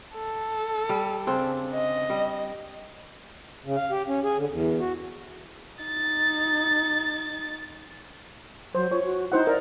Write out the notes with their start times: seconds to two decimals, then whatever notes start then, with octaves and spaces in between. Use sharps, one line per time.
0.15 A4
0.89 G3
1.27 C#3 C4 D4
1.73 D#5
2.10 G3
3.63 C#3
3.76 F5
3.91 G4
4.08 C#4
4.24 G#4
4.37 D3
4.50 E2
4.80 F#4
5.82 D#4 A6
8.75 F#3 C5
8.91 F4 C#5
9.05 F#4
9.32 D#4 E4 C5 F#5
9.47 A#4 D5